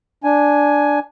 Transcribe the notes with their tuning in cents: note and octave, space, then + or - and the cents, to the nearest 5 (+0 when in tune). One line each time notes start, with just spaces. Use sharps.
D4 +0 G#5 +5